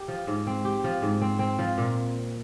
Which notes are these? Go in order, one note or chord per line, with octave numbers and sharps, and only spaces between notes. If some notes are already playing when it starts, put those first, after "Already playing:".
Already playing: G4
F3
G#2
C4
G4
F3
G#2
C4
C4
F3
A#2